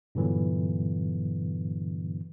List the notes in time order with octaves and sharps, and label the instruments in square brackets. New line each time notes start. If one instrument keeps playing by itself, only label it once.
[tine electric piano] G2 A#2 D3 E3 F#3 B3